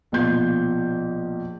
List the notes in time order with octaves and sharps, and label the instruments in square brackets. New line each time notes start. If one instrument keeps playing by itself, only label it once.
[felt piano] A#1 B2 F3 G6